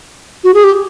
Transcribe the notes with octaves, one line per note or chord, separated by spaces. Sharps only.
F#4
G#4
G4